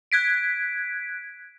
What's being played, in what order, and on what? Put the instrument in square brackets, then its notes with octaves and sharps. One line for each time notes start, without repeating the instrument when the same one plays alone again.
[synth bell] F#6 G#6 B6 D7